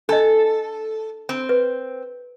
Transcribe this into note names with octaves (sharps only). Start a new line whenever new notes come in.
D4 A4 D#5
C4
B4